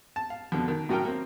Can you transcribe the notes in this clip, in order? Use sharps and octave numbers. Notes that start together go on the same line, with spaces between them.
A5
F5
F2 B2 D3
D#3
A2 F#3 C#4 A#4 G5
A#3 C4